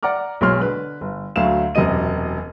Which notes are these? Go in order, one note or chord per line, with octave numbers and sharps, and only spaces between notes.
D5 F#5 A#5 D6 F6
B1 B2 G#3 C#5 C6 F6
D3 B4
G1
D2 D3 F#3 A3 F5 E7
E1 F#2 C3 D#5 D#7